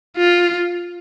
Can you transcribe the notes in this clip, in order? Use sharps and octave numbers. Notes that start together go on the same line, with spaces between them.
F4